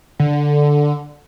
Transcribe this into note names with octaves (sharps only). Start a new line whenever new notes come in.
D3